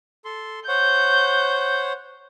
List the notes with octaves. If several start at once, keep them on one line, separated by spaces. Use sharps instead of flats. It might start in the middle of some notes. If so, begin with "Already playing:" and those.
A4 C6
C5 C#5 F#5 G6